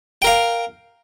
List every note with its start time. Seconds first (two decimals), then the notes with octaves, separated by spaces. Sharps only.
0.22 G5
0.24 A#4
0.27 F5